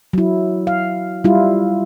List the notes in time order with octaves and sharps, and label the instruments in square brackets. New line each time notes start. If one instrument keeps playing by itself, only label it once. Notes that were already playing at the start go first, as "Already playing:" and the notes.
[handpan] F#3 E4
F5
G3 E4 F4